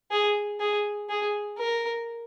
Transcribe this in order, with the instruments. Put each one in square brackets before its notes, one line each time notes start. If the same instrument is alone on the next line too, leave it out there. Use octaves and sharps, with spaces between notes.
[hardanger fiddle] G#4
G#4
G#4
A#4